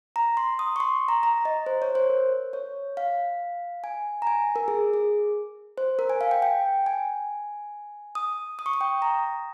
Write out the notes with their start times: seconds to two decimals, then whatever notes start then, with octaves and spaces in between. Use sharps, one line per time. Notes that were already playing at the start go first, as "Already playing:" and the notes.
0.16 A#5
0.37 C6
0.59 D#6
0.76 C#6
0.80 C6
1.08 A#5
1.23 A#5
1.45 D#5
1.66 C5
1.82 C#5
1.95 C5
2.09 A#4
2.53 C#5
2.97 F5
3.84 G#5
4.22 A#5
4.27 G#5
4.56 A#4
4.68 G#4
4.94 G#4
5.78 C5
5.99 A#4
6.10 G#5
6.21 F5
6.31 G5
6.42 G5
6.86 G#5
8.15 D#6
8.59 D#6
8.66 C#6
8.73 D#6
8.81 G5
9.02 A#5